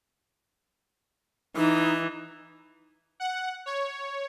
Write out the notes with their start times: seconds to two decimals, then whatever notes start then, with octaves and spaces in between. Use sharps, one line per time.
1.56 E3 D#4
3.20 F#5
3.66 C#5